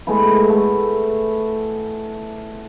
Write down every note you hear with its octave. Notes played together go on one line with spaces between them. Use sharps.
G#3 A3 B3 E4
A3